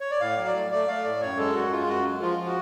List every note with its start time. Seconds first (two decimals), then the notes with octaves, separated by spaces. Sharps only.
0.01 C#5
0.11 D5
0.21 A2 F5
0.38 F#3
0.47 D5
0.54 A3
0.71 A3 D5
0.88 A3 F5
1.04 A2 D5
1.21 F#2 C#5
1.37 G#3 A4
1.54 F#2 F#4
1.71 G#3 F4
1.87 F#2 F#4
2.05 G#3
2.21 F3 F4
2.38 F3
2.46 F#4